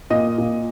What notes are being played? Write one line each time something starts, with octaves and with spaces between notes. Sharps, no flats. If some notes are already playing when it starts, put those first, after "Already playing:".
A#2 D#5
A#2